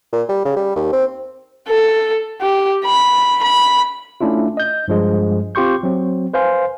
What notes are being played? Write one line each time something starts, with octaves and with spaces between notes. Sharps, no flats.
A#2
G3
C#3
G3
D#2
C4
A4
G4
B5
B5
A3 C#4 D4 E4 F4
D#5 G6
G2 F3 G#3
C4 F4 G4 C6 C#6 G6
F#3 C4
B4 C5 F5 G#5 C6